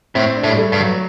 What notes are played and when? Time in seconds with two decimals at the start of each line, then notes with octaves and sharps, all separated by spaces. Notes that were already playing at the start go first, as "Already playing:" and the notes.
0.15 A2 C4
0.36 D4
0.43 A2
0.49 G3
0.58 A3
0.72 G2
0.79 F#3